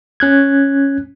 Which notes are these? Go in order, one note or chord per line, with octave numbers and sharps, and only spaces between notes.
C#4 F#6 G#6